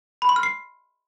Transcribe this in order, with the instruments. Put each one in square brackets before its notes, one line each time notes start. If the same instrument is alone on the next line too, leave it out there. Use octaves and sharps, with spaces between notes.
[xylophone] B5
C6
F6
C7